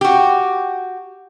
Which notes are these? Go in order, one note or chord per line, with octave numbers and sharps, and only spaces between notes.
F#4 G4